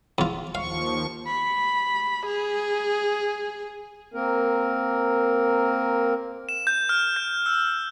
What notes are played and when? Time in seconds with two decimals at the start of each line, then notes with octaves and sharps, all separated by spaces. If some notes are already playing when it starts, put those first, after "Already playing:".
0.18 E2 F4
0.55 D#2 F3 F5 C#6
1.27 B5
2.26 G#4
4.14 A#3 C4 A#4
6.49 E7
6.67 G6
6.89 F6
7.16 G6
7.46 E6